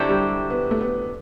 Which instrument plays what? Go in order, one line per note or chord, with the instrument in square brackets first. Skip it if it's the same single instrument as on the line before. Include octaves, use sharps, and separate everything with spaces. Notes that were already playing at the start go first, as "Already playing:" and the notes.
Already playing: [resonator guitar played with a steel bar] D3 F#3 C4 E4 G4
[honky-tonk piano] G3
B3
A3
B3